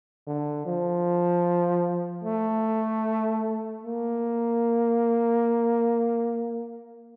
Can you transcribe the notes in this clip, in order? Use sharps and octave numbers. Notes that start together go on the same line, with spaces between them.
D3
F3
A3
A#3